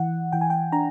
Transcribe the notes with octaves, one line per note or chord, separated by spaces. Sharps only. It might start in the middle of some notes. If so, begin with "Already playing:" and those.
Already playing: E3 F#5
E3 G5
G#5
G5
D4 A#5